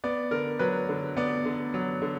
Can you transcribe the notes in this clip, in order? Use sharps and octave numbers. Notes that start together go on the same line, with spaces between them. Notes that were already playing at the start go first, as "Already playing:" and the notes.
B3 D5
D3 A#4
F#3 B4
D3
B3 D5
D3
F#3
D3